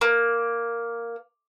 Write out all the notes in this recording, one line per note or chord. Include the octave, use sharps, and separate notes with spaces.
A#3